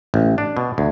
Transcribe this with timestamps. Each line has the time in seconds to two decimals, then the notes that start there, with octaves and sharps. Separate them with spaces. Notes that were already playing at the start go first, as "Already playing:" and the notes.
0.14 A1
0.38 D4
0.57 B2
0.78 D2